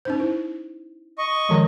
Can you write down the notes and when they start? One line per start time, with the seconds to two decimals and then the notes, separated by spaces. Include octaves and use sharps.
0.05 C#4 D#4 C5
0.20 E4
1.18 D#5 C#6
1.49 D#3 F3 G#3